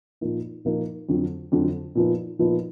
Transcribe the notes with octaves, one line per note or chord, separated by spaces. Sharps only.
A#2 F3 A#3 D#4
A#2 F3 A#3 D#4
F2 D3 F#3
F2 D3 F#3
A#2 F3 B3 D#4
A#2 F3 B3 D#4